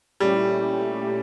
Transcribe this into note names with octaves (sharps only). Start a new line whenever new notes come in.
A#2 G3 A3 C#4 E4 G4